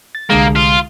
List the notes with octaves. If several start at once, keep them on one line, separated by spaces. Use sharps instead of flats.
A6
C2 D3 G#3 A#3
F4